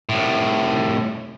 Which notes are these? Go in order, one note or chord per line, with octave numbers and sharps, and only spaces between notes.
C2 A2